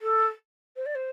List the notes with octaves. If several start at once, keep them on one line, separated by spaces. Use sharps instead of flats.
A4
C5
D5
C5